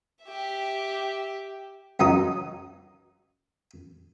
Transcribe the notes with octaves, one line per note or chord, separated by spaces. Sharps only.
G4 E5
C#2 F#2 D#4 F#4 D#6